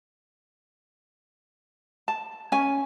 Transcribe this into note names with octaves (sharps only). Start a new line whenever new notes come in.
A5
C#4 G#5